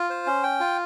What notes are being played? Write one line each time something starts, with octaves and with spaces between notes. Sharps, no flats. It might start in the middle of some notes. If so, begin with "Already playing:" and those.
Already playing: F4
C5
C#4
G5
F4